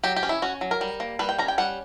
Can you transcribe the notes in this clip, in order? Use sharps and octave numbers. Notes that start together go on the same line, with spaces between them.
F#3 G4
G4
C#4
E4
C#4 F#4
F#3
A#4
G3
A#3
G3 B4
G5
C#4 A#5
G5
G3 F#5